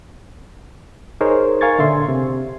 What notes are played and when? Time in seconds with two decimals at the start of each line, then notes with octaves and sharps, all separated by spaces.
1.21 D#4 G#4 A#4 C5 C#5
1.61 A#4 F5 G#5 C#6 G#6 A6
1.78 A#2 D3 E5 C6
2.08 C3